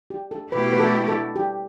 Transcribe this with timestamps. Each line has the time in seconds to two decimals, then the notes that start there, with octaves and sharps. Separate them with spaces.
0.10 G4
0.31 A4
0.52 B2 A3 E4 G4 B4
0.73 B4
0.80 A4
1.08 A4
1.36 G4